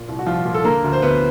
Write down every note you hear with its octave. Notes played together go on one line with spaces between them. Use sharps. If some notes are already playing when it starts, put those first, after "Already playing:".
Already playing: A#2
C2
F#4
C2 F3 F4
A#2
A4
D3 A#3 A#4
D2
C5
D2 B3 B4